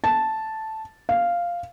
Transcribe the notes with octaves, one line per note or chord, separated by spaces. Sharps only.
A5
F5